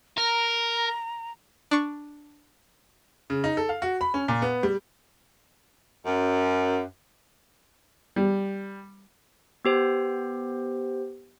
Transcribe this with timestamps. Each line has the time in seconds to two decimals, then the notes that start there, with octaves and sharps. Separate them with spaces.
0.18 A#4 A#5
1.71 D4 C#6
3.30 C#3
3.44 D#4
3.57 A4
3.69 F5
3.82 F#4
4.01 B5
4.14 C#4
4.28 A#2
4.42 B3
4.63 G3
6.05 F#2
8.16 G3
9.65 B3 G4 C5